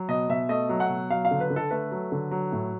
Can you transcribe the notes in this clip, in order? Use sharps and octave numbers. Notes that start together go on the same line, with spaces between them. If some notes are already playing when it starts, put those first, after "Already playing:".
Already playing: F#3
B2 D#5
B2 E5
A3 D#5
F#3
F#5
B2
F#3 F5
F5
D3
B4
D3
A4
A3 B4
F#3
D3
F#3
A2